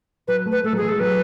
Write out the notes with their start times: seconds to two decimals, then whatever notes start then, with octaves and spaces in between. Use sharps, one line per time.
0.28 F#3 B4
0.46 A3
0.52 B4
0.64 A3 A4
0.73 F#3
0.77 G#4
0.82 E3
0.89 G#3 A4
1.00 F#3 B4